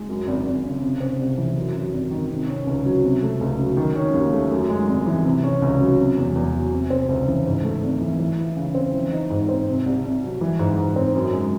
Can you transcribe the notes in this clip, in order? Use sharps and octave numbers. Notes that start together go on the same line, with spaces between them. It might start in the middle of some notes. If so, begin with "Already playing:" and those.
Already playing: G#3
F#2
G#1
G#1
C#3
C3
C4
C2
E3
F#2
F#3
G#1
D#3
C3
C#4
C#2
F#3
C3
A3
C#2
F#3
D#3
C#4
D#2
A3
F#2
G#3
G#1
E3
C3
C#4
C#2
F#3
C3
E2
E2
F#3
C3
C4
C#2
E3
G#2
A3
G#1
E3
E3
E4
C#3
C4
E3
D#4
G#2
C4
C3
C2
C2
F#3
E3
G#2
G#2
C4
F#2
G#3